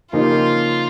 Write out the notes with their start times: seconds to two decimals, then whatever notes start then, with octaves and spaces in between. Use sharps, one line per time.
0.13 C#3 F3 A#3 D#4 F4 G4